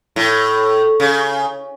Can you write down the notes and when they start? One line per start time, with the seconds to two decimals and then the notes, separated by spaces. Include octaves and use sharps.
0.16 A2
1.00 C#3